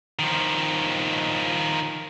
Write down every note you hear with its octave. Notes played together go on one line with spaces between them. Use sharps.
D#3 F3